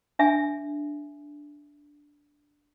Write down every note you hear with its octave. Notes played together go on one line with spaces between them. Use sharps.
D4 E5 G#5